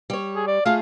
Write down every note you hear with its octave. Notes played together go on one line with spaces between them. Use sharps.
G3 C#5
G#4
D5
A3 F4 G#4 F5